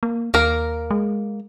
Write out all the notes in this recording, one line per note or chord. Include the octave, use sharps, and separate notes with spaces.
A#3
D#2 A#3 A#4
G#3